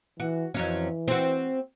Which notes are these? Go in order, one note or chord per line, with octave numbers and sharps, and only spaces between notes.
E3 F#4
F2 E3 F#3 C#4
C4 F#4